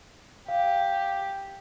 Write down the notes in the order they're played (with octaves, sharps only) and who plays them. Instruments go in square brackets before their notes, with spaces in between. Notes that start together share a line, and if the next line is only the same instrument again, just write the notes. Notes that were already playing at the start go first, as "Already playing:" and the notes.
[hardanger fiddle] G4 [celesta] F5